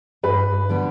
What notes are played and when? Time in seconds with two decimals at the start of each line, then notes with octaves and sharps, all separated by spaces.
0.23 G2 B4
0.69 D3 G3 B3